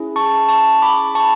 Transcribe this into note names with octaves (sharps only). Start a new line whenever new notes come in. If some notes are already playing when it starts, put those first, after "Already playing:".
Already playing: C#4 E4 G#4
A5 C#6
A5 C#6
B5 D6
A5 C#6